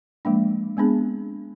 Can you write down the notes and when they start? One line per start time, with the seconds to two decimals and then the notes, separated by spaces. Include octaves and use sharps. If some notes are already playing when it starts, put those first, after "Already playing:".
0.25 F3 G#3 A#3 D4
0.77 G#3 B3 C4 D4 G#4